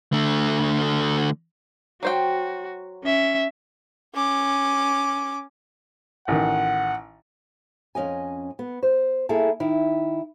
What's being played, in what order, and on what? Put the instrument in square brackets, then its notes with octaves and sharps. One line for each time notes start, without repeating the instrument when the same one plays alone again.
[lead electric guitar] D3 A3
[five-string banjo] F#3 C5 G5 [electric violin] F#4
[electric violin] C#4 E5
[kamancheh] C#4 D6
[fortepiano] A1 D#3 [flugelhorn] F#5
[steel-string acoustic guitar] F2 C#4 D#5 G#5
B3
C5
A#3 E4 G#4 A4
D#3 E4